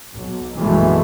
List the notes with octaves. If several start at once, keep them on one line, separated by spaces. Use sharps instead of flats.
B1
A#1 F#2 B2 E3 G#3 A3